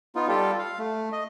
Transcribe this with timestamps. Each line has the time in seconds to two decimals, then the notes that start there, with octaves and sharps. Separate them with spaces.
0.16 B3 D#4 F4
0.28 G3 F4 G4 A4
0.59 F5
0.79 A3
1.12 D#5